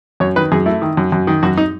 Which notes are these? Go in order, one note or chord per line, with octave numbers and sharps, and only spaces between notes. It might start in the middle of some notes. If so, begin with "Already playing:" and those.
F#2 C#5
D#3 B4
F#2 G#4
A3 E4
D#3
F#2
F#2
D#3
F#2 F#4
D#4